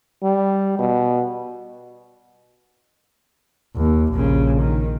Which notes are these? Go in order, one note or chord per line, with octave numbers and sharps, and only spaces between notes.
G3
B2
D#2
A#1 C#3
D#3